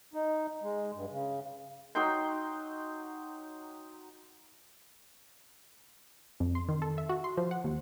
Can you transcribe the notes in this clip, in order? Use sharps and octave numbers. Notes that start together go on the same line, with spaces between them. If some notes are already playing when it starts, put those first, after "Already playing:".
D#4
G#3
G2
C#3
F#3 D#4 G5 C6
F2
C6
D#3
A4
E5
F#4
C6
F3
F#5
D#2